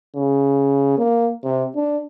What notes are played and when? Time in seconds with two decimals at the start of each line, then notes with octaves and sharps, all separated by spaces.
0.16 C#3
0.98 A#3
1.44 C3
1.76 D4